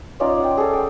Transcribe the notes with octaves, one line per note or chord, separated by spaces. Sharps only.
C#4 D#4 F4 D5
F#5 G5
G#4 A4
G5